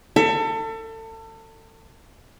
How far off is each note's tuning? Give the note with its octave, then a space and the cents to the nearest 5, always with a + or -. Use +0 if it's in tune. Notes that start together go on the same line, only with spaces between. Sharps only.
A4 +30 E5 +35